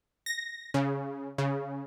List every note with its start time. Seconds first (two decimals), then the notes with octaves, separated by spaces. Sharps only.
0.26 A#6
0.74 C#3
1.38 C#3